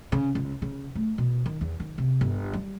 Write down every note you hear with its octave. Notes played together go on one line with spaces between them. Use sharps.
C#3
C#2
C#3
A3
B2
D#3
E2
D#3
C3
G1
G3